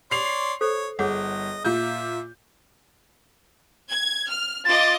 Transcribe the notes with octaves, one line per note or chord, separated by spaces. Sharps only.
C#5 D5 C6 C7 F7
A4 C5 C#5
G1 G#4 C#5 D#5 F#5
A#2 F4 E5 G6
G#6
F6
F4 D#5 D6 A6